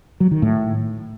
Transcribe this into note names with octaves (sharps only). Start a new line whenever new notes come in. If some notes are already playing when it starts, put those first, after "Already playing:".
F#3
D#3
A2